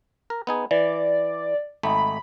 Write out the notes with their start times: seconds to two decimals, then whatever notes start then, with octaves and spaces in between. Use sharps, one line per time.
0.30 A#4
0.47 B3 D#4 G#4
0.71 E3 D5
1.83 G#1 A3 D#4 B5